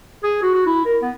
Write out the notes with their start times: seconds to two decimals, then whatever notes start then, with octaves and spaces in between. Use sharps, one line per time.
0.23 G#4
0.42 F#4
0.54 F#4
0.66 E4
0.85 A#4
1.02 B3